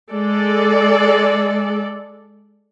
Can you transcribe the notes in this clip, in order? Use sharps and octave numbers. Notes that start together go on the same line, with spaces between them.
G#3 A4 D5